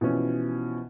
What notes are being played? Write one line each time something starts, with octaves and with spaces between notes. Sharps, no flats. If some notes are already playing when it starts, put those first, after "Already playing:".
B2 E3 F3 C#4